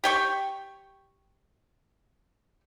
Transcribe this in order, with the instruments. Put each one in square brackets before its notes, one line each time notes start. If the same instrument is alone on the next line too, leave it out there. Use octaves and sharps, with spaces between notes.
[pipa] G4 G5 C#6